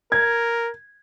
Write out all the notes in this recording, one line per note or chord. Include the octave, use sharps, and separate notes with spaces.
A#4 G#6